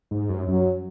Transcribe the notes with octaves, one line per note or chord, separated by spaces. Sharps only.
G#2
F#2
F#2 F#3